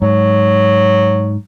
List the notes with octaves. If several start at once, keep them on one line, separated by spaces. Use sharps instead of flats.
G#2 F#3